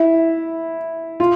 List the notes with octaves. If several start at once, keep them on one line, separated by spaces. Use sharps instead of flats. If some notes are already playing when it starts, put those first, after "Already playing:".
Already playing: E4
F4